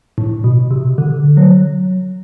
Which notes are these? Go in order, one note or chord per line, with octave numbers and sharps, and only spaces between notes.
A2
B2
C3
D3
F#3